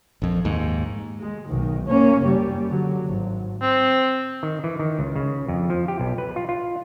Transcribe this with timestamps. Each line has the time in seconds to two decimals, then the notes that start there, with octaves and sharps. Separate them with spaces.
0.22 A#1 F2
0.45 D#2 G#2
1.20 G#3
1.49 B1 D#3
1.87 A#3 C#4
2.23 F#1 G3
2.69 D3 F#3
3.06 G#1
3.61 C4
4.43 D#3
4.64 E3
4.80 D#3
4.99 C#2
5.16 C#3
5.48 F2
5.70 F3
5.88 G4
6.00 B1
6.18 B4
6.36 F4
6.49 F4